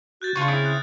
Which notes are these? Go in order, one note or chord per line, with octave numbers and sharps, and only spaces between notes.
F#4 F#6 G6 A6
C#3 D4 F4 C#6 G#6
C4 E4 G#4 C#5 D#6 F6
F#6